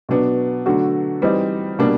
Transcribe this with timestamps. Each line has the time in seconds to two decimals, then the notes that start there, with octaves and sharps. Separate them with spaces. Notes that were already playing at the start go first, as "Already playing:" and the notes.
0.09 B2 F#3 B3 D4
0.66 D3 F#3 A3 D4 F#4
1.22 E3 G3 C4 D#4
1.79 B2 G3 A#3 D4